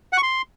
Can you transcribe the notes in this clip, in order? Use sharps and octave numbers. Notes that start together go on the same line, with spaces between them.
F#5
C#6
C6